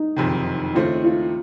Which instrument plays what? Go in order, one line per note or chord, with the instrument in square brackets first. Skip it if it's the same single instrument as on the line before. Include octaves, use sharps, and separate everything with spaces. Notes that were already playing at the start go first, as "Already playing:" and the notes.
Already playing: [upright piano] D#4
[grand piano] F#1 F2 C3 D#3
[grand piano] D#2 C#3 A3 C4 [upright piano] F4
[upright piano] F4